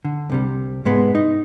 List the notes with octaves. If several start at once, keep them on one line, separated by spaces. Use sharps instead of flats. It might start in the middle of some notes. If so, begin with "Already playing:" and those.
D3
C2 C3 G3
G#2 G#3 B3
D#4